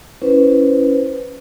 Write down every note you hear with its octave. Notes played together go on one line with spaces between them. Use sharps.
C#4 E4 B4 C5